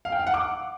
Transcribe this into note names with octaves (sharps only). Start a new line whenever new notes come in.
F5
G5
F5
F#5
D6